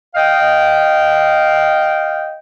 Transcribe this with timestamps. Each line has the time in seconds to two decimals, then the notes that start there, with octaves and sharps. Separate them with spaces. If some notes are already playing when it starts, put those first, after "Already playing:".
0.15 D#5 F5 G5